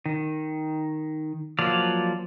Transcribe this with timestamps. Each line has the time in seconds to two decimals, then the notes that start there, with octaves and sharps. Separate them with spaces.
0.06 D#3
1.59 F3 F#3 A#3 D5 F5